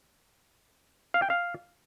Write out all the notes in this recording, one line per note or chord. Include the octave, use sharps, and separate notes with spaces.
F5
G5
F5